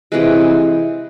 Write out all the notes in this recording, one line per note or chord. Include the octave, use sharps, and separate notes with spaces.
C3 E3 G#3 B4